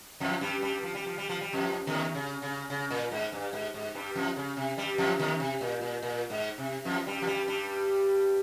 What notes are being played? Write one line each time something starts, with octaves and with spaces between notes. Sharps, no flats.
F2 F3
G2 G3
G2 G3
F3
G3
F3
G3
F3
G3
F2 F3
D#2 D#3
C#3
C#3
C#3
A#2
G#2
G2
G#2
G#2
G2 G3
F2 F3
C#3
C3
G2 G3
F2 F3
D#2 D#3
C3
A#2
A#2
A#2
G#2
C3
F2 F3
G2 G3
F3
G2 G3
G2 G3